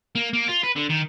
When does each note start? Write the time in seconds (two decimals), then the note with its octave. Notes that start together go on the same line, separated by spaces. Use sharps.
0.15 A#3
0.33 A#3
0.48 F4
0.63 B4
0.76 D3
0.90 D#3